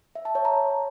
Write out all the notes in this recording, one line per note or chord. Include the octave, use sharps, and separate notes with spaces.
E5
A5
C#5
A#5